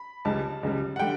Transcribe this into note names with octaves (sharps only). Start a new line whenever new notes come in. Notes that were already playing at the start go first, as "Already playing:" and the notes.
Already playing: B5
C#2 C#3 G3 A5
C#2 C#3 G3
F#5
D3 G3 G5